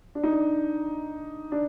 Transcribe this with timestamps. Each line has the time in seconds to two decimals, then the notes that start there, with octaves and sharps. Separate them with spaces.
0.15 D4
0.23 D#4
0.32 D4
1.52 D4